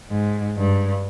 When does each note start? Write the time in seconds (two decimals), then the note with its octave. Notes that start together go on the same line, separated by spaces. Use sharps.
0.10 G#2
0.57 G2